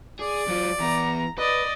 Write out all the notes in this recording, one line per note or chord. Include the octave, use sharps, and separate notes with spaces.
G#4 D5
F#3 F4
E2 B3 A#5
B4 D5 D#5